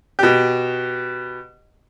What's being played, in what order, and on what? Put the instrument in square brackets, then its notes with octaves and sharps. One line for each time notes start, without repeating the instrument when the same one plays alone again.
[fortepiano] B2 G4